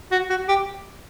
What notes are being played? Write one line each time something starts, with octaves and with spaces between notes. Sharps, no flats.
F#4
F#4
G4